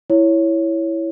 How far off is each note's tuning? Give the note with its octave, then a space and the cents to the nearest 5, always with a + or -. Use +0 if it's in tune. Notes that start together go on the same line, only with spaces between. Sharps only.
E4 +0 C#5 +0